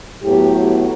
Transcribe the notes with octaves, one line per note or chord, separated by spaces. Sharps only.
A2 F#3 B3 G4